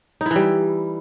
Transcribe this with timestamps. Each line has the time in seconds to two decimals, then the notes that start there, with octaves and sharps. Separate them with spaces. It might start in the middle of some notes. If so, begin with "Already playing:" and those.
0.21 D#4
0.26 E4
0.31 E3
0.36 G3